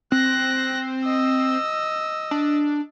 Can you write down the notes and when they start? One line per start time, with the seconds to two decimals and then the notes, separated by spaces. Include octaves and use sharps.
0.12 C4 F#6 A#6
1.05 D#5 E6
2.31 D4